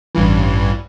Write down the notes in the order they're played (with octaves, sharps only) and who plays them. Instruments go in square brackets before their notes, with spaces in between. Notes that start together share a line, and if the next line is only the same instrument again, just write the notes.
[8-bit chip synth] A1 G2 E3